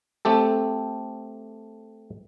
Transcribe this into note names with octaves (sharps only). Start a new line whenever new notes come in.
A3 C4 G4 A4